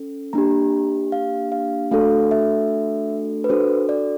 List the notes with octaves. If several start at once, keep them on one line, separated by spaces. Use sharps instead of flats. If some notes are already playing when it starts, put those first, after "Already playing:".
Already playing: C#4 A4
A#3 D4 G4 A#5
F5
F5
A3 D4 F#4 A4 F5
E5
B4
D4 F#4 A4 C5
D5